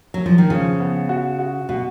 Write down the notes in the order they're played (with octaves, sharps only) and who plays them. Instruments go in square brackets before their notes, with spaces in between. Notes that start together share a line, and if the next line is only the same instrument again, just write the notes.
[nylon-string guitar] F#3
F3
D#3
[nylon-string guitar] C#3 [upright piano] F3
[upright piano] B3
F#4
F#4
[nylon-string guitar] B2 [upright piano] F#4